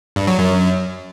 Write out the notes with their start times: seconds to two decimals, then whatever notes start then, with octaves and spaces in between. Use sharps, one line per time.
0.16 G2
0.27 F#3
0.39 F#2